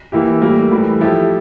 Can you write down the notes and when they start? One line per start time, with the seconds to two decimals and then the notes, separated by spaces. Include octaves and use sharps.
0.12 E3 A#3 E4 G4
0.42 A2 G3 A#3
0.72 A2 E3 G3
1.00 F3 A3 E4 G4